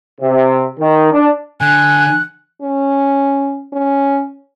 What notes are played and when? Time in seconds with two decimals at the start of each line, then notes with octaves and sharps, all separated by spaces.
0.19 C3
0.77 D#3
1.10 D4
1.61 D3 G#5 F#6
2.62 C#4
3.73 C#4